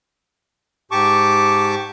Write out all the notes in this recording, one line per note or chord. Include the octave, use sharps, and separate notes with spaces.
G#2 G4 A5 C#6 D6